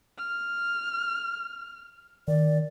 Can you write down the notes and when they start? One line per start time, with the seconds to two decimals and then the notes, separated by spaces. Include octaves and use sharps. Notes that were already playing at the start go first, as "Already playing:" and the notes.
0.18 F6
2.28 D#3 D5